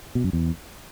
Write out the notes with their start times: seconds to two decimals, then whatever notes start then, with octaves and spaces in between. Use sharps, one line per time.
0.15 B2
0.24 F#2
0.33 E2